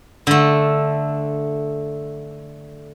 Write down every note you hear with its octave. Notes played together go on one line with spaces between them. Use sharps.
D3 A3